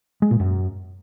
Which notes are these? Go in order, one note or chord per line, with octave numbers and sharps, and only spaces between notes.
G#3
A#2
F#2